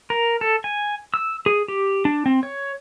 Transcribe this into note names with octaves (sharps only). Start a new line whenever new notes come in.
A#4
A4
G#5
E6
G#4
G4
D4
C4
C#5